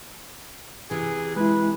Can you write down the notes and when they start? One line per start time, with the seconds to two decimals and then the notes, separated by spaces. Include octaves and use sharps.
0.91 C3 E3 G#4
1.36 G#3 E4 B4